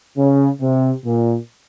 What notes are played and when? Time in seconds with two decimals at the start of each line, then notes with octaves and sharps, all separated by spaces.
0.18 C#3
0.61 C3
1.05 A#2